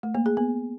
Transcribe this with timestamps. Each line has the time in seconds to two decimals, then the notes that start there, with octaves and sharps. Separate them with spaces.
0.03 A3
0.15 A#3
0.26 G#4
0.37 B3